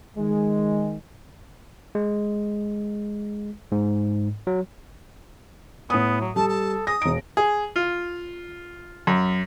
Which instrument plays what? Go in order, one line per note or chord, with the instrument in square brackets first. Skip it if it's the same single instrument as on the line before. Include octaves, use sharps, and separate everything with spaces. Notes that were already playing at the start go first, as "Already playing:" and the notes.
[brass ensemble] D#3 G#3
[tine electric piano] G#3
G#2
F#3
[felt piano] A2 D#6 [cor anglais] B3
[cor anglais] F#3
[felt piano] G3 [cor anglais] A4 [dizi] A5
[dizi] A5
[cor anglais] G#4 [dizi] D#6 [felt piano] A#6
[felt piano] E1 D7 [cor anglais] D#4
[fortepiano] G#4
F4
F#2